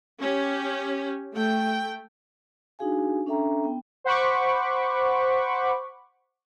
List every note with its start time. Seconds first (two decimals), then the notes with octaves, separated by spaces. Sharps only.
0.21 C#4 G4
1.33 A3 G5
2.79 D4 D#4 F#4 G#4 F5 G#5
3.26 C#4 D4 A4 E5 G5 A#5
3.64 B3 G5
4.04 C5 F#5 B5 C#6 D6